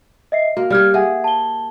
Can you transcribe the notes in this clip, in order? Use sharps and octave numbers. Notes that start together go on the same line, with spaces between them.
D#5 E5 C7
A#3 F#4
G3 G4 D5 F6 G#6
G#4 E5 F#5 G#5
A5 G7